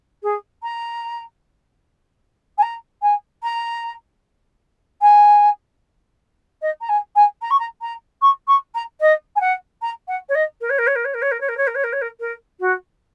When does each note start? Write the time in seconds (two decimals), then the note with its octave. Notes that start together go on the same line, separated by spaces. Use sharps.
0.23 G#4
0.62 A#5
2.58 G#5
2.62 A#5
3.02 G#5
3.43 A#5
5.01 G#5
6.61 D#5
6.81 A#5
6.89 G#5
7.15 G#5
7.41 A#5
7.50 C#6
7.59 A#5
7.81 A#5
8.21 C#6
8.47 C#6
8.74 A#5
9.00 D#5
9.35 G#5
9.40 F#5
9.81 A#5
10.08 F#5
10.29 C#5
10.35 D#5
10.61 A#4
10.70 C#5
10.78 A#4
10.87 C#5
10.95 A#4
11.04 C#5
11.14 A#4
11.22 C#5
11.31 A#4
11.40 C#5
11.48 A#4
11.57 C#5
11.67 A#4
11.75 C#5
11.83 A#4
11.92 C#5
12.01 A#4
12.20 A#4
12.60 F#4